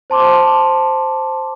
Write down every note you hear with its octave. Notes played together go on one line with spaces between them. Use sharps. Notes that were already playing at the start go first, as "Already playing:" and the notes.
C5 A5 C6 D6